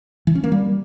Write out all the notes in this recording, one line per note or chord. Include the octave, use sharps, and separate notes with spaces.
E3
C#4
A#3
G3